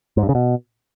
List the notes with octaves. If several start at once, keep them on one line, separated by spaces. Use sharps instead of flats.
G#2
G2
C#3
B2